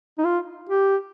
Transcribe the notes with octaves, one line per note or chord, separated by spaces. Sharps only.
D#4
F4
G4